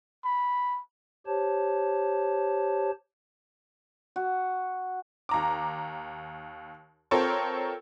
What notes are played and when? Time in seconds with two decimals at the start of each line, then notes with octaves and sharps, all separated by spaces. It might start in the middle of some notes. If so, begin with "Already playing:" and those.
0.25 B5
1.27 G4 C5 C#5 A5
4.16 F#4
5.29 D#2 A#5 D6
7.11 C4 F4 A4 A#4 C5 C#5